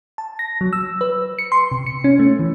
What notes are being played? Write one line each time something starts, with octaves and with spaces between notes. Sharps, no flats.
A5
A#6
F#3
E6
B4
C#7
C6
C3
C#7
C#4
A3
E3